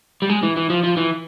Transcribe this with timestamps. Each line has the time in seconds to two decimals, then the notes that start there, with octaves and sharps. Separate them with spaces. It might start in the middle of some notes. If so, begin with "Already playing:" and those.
0.22 G3
0.30 G#3
0.43 E3
0.57 E3
0.70 F3
0.84 F3
0.97 E3